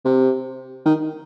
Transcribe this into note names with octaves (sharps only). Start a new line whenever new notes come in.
C3
D#3